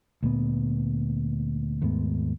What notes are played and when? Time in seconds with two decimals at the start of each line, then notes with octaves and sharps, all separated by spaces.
0.23 D2 A#2 B3
1.81 D#2 G#2 A3 B3